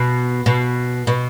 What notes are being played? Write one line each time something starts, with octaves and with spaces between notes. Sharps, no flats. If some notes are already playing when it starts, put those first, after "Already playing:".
Already playing: B2
B2
B2